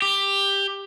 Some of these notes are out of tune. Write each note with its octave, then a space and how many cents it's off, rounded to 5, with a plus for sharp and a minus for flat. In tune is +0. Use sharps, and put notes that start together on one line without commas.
G4 +10